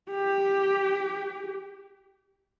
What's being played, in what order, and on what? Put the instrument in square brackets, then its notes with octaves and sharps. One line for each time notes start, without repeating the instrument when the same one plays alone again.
[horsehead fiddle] G4